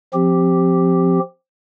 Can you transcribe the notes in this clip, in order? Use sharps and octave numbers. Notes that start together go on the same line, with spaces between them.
F3 C4 G4